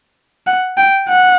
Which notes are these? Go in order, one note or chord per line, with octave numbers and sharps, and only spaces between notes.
F#5
G5
F#5